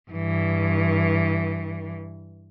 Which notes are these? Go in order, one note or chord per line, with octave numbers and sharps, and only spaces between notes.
G2 E3